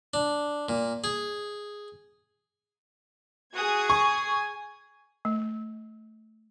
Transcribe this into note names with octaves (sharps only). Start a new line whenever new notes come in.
D4
A#2
G#4
F#4 G#4 D#6 G#6
G#5 C#6
A3